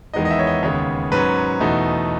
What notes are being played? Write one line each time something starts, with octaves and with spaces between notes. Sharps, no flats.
E2 D#3 G#3 B3 D#4 D#5
D#5
E5
C#5
D#5
D#2 C#3 G#3 B3 C#5
G#2 F#3 C#4 B4
E2 B2 A3 D#4